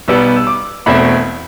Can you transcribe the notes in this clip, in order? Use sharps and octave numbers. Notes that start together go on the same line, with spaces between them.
B1 B2 G3 B3 E6
E6
D6
E1 E2 B2 A3 C4 B5